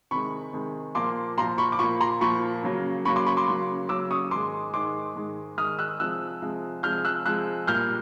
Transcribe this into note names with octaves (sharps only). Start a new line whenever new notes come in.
C3 D#3 G#3 B5 C#6
C3 D#3 G#3
A#2 F3 A#3 C6 D6
A#2 F3 A#3 A#5 C6
B5 C#6
D6
A#2 F3 A#3 B5 C#6
A#5 C6
A#2 F3 A#3 B5 C#6
C#3 F#3 A#3
C#3 F#3 A#3 B5 C#6
C6 D6
B5 C#6
C6 D6
C#3 F#3 A#3
C#3 F#3 A#3 D6 E6
C#6 D#6
G#2 D#3 G#3 C6 D6
G#2 D#3 G#3 C6 D6
G#2 D#3 G#3
G#2 D#3 G#3 D#6 F6
E6 F#6
C3 F3 G#3 E6 F#6
C3 F3 G#3
C3 F3 G#3 F6 G6
E6 F#6
C3 F3 G#3 E6 F#6
A#2 G3 A#3 F6 G6